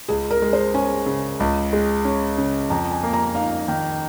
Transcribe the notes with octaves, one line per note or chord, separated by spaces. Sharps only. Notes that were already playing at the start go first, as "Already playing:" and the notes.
C#2 G#4
A#4
G#3
C5
C#4 G#5
C#3
C#2
G#3
C#4
C#3
F2 A#5
G#5
A#3
A#5
D#4 F5
D#3